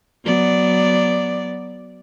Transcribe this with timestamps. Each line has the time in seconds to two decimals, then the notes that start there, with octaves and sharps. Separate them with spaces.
0.25 F#3 B3 D5